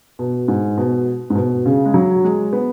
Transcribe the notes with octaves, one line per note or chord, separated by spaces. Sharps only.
B2
G#2
B2
G#2
B2
C#3
G#3
F#3
G#3
B3